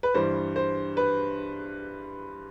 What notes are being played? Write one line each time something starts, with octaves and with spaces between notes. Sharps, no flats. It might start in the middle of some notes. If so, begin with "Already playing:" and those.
B4
G2 E3 G3 C5
C5
B4